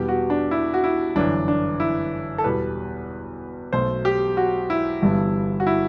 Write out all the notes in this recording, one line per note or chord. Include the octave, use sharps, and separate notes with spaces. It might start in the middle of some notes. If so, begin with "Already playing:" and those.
Already playing: E2 B2 G3 B3 G4
F#4
D4
E4
F#4
E4
G1 F#2 E3 D4
D4
E4
A4
E2 B2 G3 B4
B1 B2 A3 C5
G4
F#4
E4
G1 G2 E3 G3 B3
F#4
E4